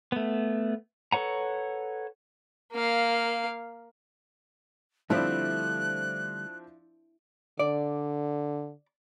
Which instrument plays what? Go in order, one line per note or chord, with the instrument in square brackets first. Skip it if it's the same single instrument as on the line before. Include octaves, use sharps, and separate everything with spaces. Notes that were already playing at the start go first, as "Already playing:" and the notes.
[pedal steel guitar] A3 B3
A4 B4 C#5 F#5 A#5
[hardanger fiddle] A#3 F5
[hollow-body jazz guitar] D3 G3 A3 [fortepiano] F3 C4 D4 [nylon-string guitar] E4 [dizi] F#6
[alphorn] D3 [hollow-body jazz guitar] D5